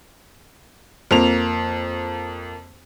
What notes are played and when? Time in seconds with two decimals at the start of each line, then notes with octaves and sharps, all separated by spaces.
1.11 F2 A#3 F7